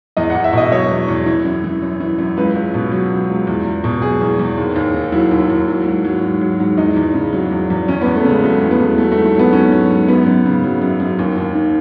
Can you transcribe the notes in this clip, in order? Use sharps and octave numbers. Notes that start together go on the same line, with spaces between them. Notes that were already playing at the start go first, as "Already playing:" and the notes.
E2 D#5
E2 F#5
E5
B2 D#5
F#3 C#5
E2
E2
E3
F#2
E3
F#2
E3
F#2
C#2 B4
C#2
B2
F#3
C#2
C#2
E2
E2
B2
F#3 G#4
E2
E2
D#2
D#2
D#3
F#3 E4
D#2
E4
D#2
F#3
G#2
F#3
G#2
F#3
G#2
E2 D#4
E2
C#3
F#3
E2
E2
E2 C#4
E2 B3
A3
C#3 G#3
F#3 A3
E2
B3
E2
F#3 A3
A3
G#2
A3
F#3 B3
G#2 C#4
F#3
G#2
F#2 B3
F#2
C#3
F#3
F#2
F#2
D#2
D#2
D#3